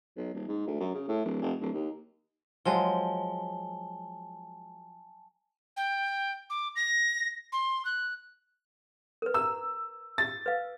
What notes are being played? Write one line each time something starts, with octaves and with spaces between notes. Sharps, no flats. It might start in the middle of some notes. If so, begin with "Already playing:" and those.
B1
D#1
G#2
D2
F#2
C#3
A2
D1
F1
D1
D#2
F3 F#3 G#3 G#5 A5 G7
G5
D6
A#6
C6
F#6
A#4 B4
A#5 E6
A6
B4 F5